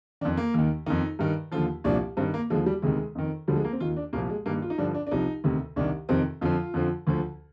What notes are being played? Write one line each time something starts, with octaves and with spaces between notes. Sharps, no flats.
F2 D#3 D4
A#3
D#2 D#3
F2 D#3 D#4
G2 D#3
D#2 D3 F3 F4
C2 A#2 F3 D4
G2 D#3 C4
A#3
D#2 D3 F3 G#3
G3
D2 C3 D#3 G#3
F2 D#3
D2 D3 F3 G3
G#3
A#3
C4
D#2 D#3 F4
D4
C2 A#2 F3 A#3
G#3
G2 D#3 A#3
F4
D#4
G2 D3 F3 D4
D4
D4
C2 C3 F3 D#4
D2 C3 D#3
C2 C3 D#3 D4
F2 C3 D#3 C4
F2 D3 F3 F4
F2 D3 F3
D2 D3 F3